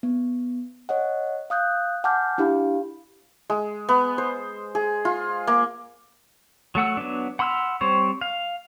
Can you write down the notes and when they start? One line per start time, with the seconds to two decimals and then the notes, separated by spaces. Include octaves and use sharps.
0.03 B3
0.89 C#5 D#5 F#5
1.50 F5 D#6 F#6 G6
2.04 F#5 G#5 A5 D6 F6 G6
2.38 D4 E4 G4 F5 B5
3.50 G#3
3.89 B3
4.18 C5
4.75 G#4
5.05 F4
5.47 A#3
6.75 F#3 A3 F#5 E6
6.97 F#3 B3 D4
7.39 F#5 B5 C6 E6 F6
7.81 G3 C4 C5 C#5
8.21 F5